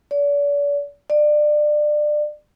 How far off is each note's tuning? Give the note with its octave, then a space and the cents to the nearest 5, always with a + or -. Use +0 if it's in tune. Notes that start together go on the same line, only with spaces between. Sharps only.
D5 -40
D5 +25